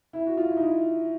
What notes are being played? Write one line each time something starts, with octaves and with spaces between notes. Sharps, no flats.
E4
F#4
F4
E4
D#4
E4